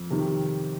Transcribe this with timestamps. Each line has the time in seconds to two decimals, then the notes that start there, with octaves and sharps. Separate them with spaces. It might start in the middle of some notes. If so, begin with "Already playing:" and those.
Already playing: F2
0.10 C3 D#3